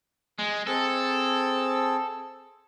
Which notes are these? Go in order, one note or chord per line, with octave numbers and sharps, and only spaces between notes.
G#3
C4 G#4 A4 E6